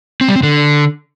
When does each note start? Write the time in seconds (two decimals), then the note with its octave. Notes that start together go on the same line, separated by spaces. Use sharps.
0.21 C4
0.28 G3
0.36 C4
0.43 D3